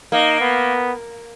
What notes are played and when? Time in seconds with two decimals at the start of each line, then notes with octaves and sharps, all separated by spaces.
0.12 A#3 D#4
0.40 B3